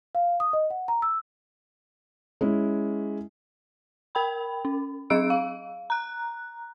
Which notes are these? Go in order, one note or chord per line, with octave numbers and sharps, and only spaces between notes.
F5
D#6
D#5
F#5
A#5
E6
G#3 C#4 E4
A#4 G5 B5
C#4
F#3 C4 G#4 D#5 E6 D7
F5
A#5 F#6